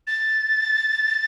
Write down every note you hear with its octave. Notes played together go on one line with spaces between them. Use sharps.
A6